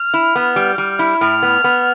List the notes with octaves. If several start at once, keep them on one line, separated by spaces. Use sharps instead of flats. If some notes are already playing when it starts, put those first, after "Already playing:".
Already playing: F6
E4
B3
G3
G3
E4
A2 F6
B3
B3